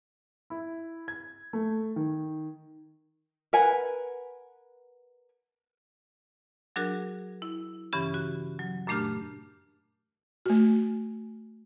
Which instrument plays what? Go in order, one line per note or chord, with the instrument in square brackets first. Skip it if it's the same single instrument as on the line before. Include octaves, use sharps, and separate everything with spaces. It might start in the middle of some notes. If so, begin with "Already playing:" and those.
[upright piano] E4
G#6
A3
D#3
[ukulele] A#4 B4 F#5 G#5
[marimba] F#3 D4 F#4 G#4 A#4
E4
G2 C#3 E3 C#4 G4
F#4
F#3
F#2 A#2 A3 D4 G4 F6
[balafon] A3 F#4